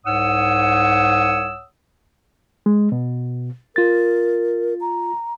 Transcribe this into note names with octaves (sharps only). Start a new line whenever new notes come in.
C2 G#2 C#5 F#5 D#6 E6
G#3
B2
F4 A#4 A6
A#5